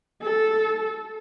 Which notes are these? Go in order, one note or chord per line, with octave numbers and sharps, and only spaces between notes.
A4